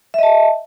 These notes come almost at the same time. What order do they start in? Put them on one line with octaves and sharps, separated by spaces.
E5 D#5 A5